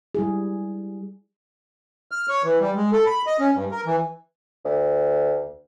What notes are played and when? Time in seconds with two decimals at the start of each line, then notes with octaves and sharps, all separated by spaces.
0.15 G3 E4 G#4
2.11 F6
2.29 C#5
2.44 E3
2.60 G3
2.76 G#3
2.92 A4
3.06 B5
3.27 D#5
3.40 C#4
3.54 G2
3.72 A#4
3.86 E3
4.64 D2